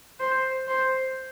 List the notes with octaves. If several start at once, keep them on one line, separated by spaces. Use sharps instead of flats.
C5
C5